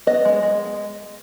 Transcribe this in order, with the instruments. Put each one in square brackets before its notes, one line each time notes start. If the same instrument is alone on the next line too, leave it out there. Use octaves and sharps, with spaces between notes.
[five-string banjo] B3 D#5
G#3
G#3